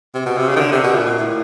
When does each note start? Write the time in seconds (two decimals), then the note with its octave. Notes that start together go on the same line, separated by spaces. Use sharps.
0.14 C3
0.26 B2
0.37 C3
0.48 C#3
0.56 D#3
0.60 D3
0.72 C3
0.84 B2
0.95 A#2
1.06 A#2
1.19 A2